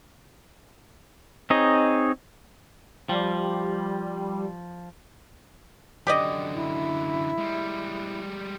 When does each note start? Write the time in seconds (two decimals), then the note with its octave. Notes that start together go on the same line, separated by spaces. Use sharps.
1.50 C4 D#4 G#4 C#5 D#5
3.09 F3 G3
6.07 F#2 D3 G4 D5 D#5
6.55 E4
7.38 G3 G#3